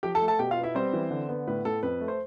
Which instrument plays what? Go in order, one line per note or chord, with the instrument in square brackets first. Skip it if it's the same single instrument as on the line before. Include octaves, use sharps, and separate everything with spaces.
[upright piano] F3 G4 G5
A4 A5
A3
A4 A5
B2 G4 G5
F4 F5
B3
E4 E5
G3 C4 C5
E3
D3
B3
A2 B4
A2 A4
F2 B4
A3
C5